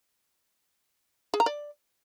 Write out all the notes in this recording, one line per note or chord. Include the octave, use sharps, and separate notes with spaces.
G#4
A#5
D5